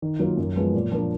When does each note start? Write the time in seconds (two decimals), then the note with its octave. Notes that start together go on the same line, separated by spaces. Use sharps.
0.02 D#3
0.19 F#3 A#3 F4
0.37 F#2
0.56 F3 G#3 B3
0.74 A#2
0.92 F3 A#3 D4